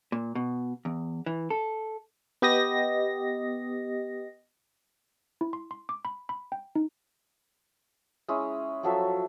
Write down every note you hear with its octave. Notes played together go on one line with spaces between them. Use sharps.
A#2
B2
E2
E3
A4
B3 G4 D#5 A#6
E4
C6
C6
D6
B5
B5
G5
D#4
G#3 C#4 E4
F3 F#3 A4 E5